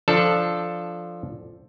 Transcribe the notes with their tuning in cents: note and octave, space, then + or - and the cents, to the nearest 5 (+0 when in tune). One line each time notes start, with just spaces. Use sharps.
F3 +0 D4 +0 A4 +0